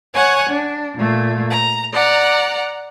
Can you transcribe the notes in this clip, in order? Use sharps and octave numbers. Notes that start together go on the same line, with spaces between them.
C#5 F#5 G#5
D4
A#2 A3
A#5
D5 F#5 A#5